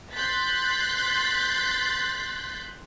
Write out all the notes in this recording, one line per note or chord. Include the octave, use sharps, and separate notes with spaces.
C6 F#6 G6 A6 B6